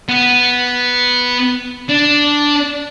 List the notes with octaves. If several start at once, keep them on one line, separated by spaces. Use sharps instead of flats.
B3
D4